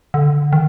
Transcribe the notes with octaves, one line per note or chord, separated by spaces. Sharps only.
D3
D#3